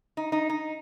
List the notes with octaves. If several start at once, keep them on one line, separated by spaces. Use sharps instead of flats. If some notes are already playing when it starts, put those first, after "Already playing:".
D#4
D#4
D#4